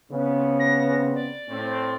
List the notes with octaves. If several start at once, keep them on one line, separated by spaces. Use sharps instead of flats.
C#3 B3 C4
A#6
D5
A2 C4